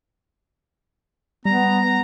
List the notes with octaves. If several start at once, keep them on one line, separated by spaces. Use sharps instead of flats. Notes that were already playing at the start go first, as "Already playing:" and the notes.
G3 B3 A#5